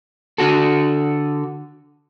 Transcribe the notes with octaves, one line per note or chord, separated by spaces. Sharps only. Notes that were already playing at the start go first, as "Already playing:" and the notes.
D3 F#4 A4